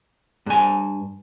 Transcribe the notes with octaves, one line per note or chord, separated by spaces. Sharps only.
G2 G#5